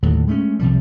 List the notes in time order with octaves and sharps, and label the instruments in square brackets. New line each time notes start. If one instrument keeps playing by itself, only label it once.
[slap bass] D#2 A2 D3 F#3
G#3 A3 C4 C#4
C2 C3 F3 G3